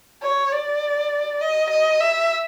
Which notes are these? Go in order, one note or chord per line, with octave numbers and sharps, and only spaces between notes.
C#5
D5
D#5
D#5
E5